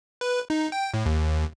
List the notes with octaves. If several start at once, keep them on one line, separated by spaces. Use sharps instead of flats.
B4
D#4
G5
A2
D#2